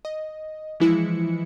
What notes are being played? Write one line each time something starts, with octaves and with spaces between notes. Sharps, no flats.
D#5
E3 F3 G#3 E4 C#7